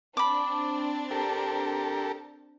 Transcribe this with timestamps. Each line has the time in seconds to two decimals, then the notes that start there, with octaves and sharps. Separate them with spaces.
0.17 C4 D4 B5 D6
1.11 G4 A4 A#4